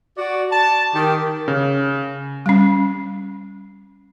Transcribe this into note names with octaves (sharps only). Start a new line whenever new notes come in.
F#4 D5
A5
D#3 G4
C#3
G3 C#4